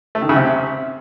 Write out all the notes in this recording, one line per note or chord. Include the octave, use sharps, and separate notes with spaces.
A3
D#3
C#3
C3